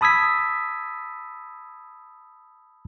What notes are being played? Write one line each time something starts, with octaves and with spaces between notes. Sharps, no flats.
A5 B5 D#6 E6 G#6 B6